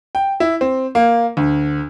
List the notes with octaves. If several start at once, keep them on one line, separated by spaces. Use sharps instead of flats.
G5
E4
C4
A#3
D2